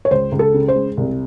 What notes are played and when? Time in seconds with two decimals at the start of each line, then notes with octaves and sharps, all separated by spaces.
0.05 C#5
0.11 C#2 C5
0.32 C#2
0.39 A4
0.54 C#3
0.68 C5
0.75 G#3
0.97 C2